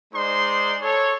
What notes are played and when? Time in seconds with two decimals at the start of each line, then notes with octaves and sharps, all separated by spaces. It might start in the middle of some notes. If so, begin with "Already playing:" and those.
0.14 G#3 D#4 C5 D5 C6
0.82 A4 C#5